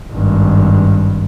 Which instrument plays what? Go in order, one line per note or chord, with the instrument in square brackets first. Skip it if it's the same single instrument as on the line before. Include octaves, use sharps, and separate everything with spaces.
[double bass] G#1 G2